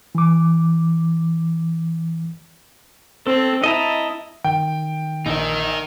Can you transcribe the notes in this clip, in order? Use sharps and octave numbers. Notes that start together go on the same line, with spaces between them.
E3 D6
C4 A4
E4 D#5 A5 A#5
D#3 G5
A#1 D#4 A#4